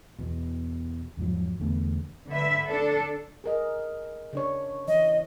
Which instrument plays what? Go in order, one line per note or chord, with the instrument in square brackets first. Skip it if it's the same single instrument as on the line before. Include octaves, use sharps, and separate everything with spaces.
[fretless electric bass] E2 B2
E2 G#2 F3 F#3
E2 D3 A3 B3
[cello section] D3 B4 E5
D4 A4
[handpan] G#4 A#4 D#5
C#3 D4 C#5
[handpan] E3 [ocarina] D#5